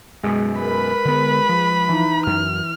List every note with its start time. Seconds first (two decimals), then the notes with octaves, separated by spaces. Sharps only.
0.23 F#2 B2 G#3
0.60 A#4 B4 B5
1.05 D3 B3
1.49 F3
1.89 E3 D#4
2.27 F#2 F6